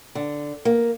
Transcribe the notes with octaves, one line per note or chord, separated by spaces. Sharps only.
D3
A#3